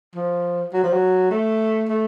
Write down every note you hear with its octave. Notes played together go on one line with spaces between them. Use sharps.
F3
F#3
F3
F#3
A3
A3